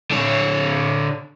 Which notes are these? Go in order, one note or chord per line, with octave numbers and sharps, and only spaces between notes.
D3 C#5